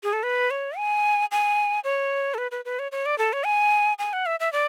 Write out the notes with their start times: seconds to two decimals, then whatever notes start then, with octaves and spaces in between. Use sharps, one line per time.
0.03 G#4
0.13 A4
0.23 B4
0.51 C#5
0.77 G#5
1.31 G#5
1.84 C#5
2.34 A4
2.38 B4
2.51 B4
2.65 B4
2.79 C#5
2.92 C#5
3.06 D5
3.18 A4
3.33 C#5
3.45 G#5
3.99 G#5
4.13 F#5
4.26 E5
4.40 E5
4.53 D5